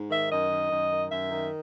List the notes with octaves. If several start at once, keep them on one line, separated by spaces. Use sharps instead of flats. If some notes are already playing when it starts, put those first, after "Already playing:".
Already playing: G#2
D#3 E5
F#2 D#5
D#3
F#2
D#3
F#2 E5
D#3